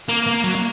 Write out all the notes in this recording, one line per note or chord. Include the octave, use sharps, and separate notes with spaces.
A#3
A#3
F#3
A#3